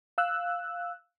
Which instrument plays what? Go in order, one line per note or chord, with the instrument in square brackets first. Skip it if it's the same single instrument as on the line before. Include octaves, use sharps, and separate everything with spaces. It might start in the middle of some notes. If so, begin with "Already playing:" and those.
[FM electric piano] F5 E6 F#6